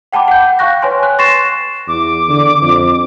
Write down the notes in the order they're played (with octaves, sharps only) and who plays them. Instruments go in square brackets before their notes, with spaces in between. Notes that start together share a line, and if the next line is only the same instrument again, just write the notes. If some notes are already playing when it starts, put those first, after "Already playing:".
[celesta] F#5 G5 A5 B5 D6
F#5 G6
F5 G5 C#6 F#6 A#6
B4 C#5 G#5 C6
F#6
C6 C#6 A6 A#6 C7 E7
[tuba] E2 [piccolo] D6
[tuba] D3
F2